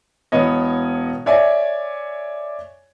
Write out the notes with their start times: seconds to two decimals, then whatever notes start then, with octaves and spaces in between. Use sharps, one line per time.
0.32 E1 B3 C#5 D#5
1.26 C#5 D5 E5 G#5